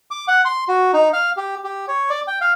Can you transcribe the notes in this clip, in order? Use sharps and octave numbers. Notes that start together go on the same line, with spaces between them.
D6
F#5
C6
F#4
D#4
F5
G4
G4
C#5
D5
G5
F5